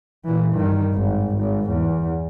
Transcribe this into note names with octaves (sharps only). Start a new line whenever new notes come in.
A#2 E3
G2 D#3
G#1
G#1
E2